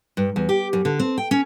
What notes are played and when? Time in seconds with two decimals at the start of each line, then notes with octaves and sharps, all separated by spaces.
0.17 G2
0.36 E2
0.49 G4
0.73 F#2
0.85 D3
1.00 C4
1.18 G5
1.31 C#4